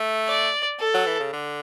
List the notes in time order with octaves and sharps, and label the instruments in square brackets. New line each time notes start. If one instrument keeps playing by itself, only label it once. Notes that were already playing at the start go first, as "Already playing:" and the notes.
Already playing: [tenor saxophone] A3
[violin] D5
A4
[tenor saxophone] F#3
E3
C#3
D3